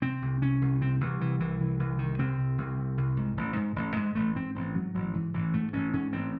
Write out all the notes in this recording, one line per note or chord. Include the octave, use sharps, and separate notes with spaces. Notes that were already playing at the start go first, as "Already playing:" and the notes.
C3 C4
C2
C3 C#4
C2
C3 C4
C2 E3
C3 E3
C2 E3
C3 E3
C2 E3
C3 D#3
C2 C4
C3
C2
C3
C2
G#2
A1
G#2
A1
G#2 G#3
A1 A3
G#2 C4
A1 C4
G#2 F#3
A1 F#3
G#2 E3
A1 E3
G#2 A3
A1 C#4
G#2 C#4
A1 C4